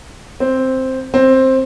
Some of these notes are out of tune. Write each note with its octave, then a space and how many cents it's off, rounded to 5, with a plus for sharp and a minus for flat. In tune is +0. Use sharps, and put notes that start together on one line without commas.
C4 +0
C4 +10